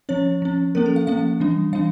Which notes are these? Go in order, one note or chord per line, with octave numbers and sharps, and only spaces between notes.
F3 C#4 C#5
F3 C#4
F3 A#3 C#4 A#4
A4
F5
F3 A#3 C#4 F5
E3 G3 D4
E3 G3 D4 F5